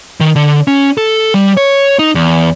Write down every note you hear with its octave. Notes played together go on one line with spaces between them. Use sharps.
D#3
D3
C#4
A4
G3
C#5
D#4
E2